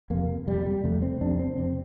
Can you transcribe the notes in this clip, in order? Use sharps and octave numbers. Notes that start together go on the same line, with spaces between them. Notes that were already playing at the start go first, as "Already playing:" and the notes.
F2 C3 A#3
F2 C3 G3
G3
F2 C3 A3
C4
F2 C3 D4
C4
F2 C3 C4